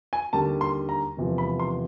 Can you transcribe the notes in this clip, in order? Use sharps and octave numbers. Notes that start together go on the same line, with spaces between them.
G#5
D#2 D3 G3 A5
C6
A#5
E1 E2 C3 F3
B5
C6